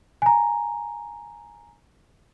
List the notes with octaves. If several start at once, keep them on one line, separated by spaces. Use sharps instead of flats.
G#5 A#5